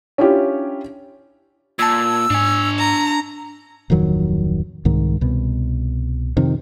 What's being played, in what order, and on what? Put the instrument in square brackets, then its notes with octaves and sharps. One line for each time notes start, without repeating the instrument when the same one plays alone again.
[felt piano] C#4 D4 E4 F4 G4 C#5
[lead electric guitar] A#2 [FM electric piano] A5 G#6 [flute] E6
[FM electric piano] G#2 [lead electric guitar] D4 G#5
[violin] A#5
[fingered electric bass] D1 F2 D#3 F#3
C2 G#2 D#3
C2 B2
F2 C3 D#3